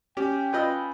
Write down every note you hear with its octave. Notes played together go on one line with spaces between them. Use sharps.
C#4 G4 G5
F4 B4 D#5 B5 E6 G6